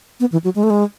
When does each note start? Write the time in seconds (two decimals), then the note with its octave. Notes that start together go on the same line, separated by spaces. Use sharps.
0.20 B3
0.32 E3
0.44 F#3
0.55 G#3
0.63 A3
0.70 G#3